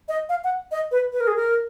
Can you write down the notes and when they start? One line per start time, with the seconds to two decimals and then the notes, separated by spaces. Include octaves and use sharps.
0.08 D#5
0.29 F5
0.44 F#5
0.72 D#5
0.91 B4
1.13 B4
1.20 A#4
1.27 G#4
1.36 A#4